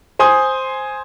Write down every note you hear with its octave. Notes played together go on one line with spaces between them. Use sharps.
C5 G#5 C6 D#6